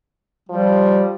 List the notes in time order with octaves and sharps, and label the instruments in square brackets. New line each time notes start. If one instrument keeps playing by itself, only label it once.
[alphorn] F3 [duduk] G3